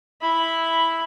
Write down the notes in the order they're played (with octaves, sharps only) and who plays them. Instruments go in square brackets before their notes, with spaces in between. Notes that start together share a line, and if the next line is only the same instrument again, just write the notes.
[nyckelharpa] E4 B5